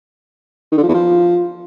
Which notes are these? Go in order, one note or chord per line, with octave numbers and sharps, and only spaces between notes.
D#3
D3
F3
E2
F3